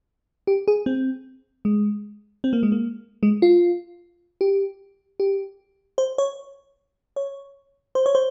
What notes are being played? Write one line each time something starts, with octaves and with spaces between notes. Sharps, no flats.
G4
G#4
C4
G#3
C4
A#3
G#3
A#3
G#3
F4
G4
G4
C5
C#5
C#5
C5
C#5
C5